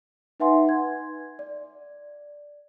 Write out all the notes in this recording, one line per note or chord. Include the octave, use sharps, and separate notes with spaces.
D#4 B4 E5 F#5 G#5 C6
G#6
D5